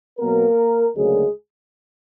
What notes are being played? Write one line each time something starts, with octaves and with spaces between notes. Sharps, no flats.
B2 F#3 A#3 B3 A#4
D2 C#3 F#3 G#3 A#3 G#4